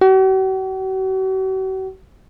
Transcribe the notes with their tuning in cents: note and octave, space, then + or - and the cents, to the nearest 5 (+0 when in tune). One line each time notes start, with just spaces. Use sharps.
F#4 +45